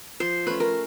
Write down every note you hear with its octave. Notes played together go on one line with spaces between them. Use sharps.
F3 C5
A3 C#4 B4
A#4